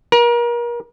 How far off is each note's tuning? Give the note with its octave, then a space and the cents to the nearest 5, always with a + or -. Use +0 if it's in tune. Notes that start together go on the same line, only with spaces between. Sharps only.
A#4 +35